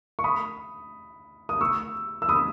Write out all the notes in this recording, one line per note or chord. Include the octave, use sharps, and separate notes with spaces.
C#6
B5 D#6
D#6
C#6 E6
E6
B5 D#6